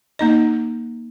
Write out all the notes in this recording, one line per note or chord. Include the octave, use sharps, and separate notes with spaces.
A#3 D#4 D#5